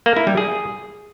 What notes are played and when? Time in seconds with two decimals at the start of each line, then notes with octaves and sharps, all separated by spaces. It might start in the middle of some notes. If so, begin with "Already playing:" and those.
0.06 A#3
0.16 E4
0.27 G3
0.37 G#4